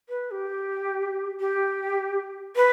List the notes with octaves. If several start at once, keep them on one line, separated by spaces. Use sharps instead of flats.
B4
G4
G4
B4